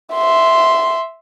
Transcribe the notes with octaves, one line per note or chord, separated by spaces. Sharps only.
E5 C6